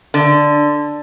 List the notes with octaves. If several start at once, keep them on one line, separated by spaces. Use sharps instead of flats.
D3